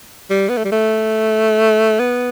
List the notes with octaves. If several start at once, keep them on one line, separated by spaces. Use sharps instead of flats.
G3
B3
A3
G3
A3
B3